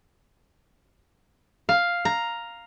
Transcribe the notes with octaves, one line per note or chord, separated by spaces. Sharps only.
F5
A#5